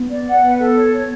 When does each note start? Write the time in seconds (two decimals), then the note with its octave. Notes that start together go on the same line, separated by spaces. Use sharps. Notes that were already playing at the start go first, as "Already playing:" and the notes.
Already playing: B3
0.09 D5
0.27 F#5
0.42 B4
0.59 A4
0.76 C#5
0.93 C#5